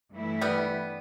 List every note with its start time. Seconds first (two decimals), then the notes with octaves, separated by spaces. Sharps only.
0.11 G2 E3 A3 E4
0.41 G3 B3